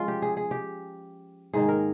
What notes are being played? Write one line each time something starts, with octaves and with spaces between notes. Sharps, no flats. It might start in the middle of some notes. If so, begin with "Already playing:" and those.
Already playing: F3 G#3 C#4 F4
G4
G#4
G#4
G4
G#2 D#3 A#3 G#4
A#4